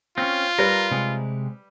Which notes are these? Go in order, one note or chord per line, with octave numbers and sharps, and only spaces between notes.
C4 C#4 F4
G3 A#4 B4
C3 G#3